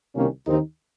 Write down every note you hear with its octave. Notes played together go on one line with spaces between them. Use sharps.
C2 C3 D#3 A#3 C#4
D#2 D#3 C4 D#4